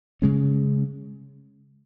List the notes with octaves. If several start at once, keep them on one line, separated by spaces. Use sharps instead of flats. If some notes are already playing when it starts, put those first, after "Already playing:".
C#3 G#3 C#4